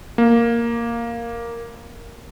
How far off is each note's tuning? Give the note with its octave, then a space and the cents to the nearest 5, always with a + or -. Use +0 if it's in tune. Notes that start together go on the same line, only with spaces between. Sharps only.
A#3 +0